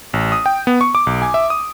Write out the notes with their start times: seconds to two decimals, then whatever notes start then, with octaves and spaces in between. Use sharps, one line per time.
0.13 A1
0.32 D#6
0.46 G5
0.67 B3
0.81 C#6
0.95 D6
1.07 B1
1.22 G#5
1.34 E5
1.50 D#6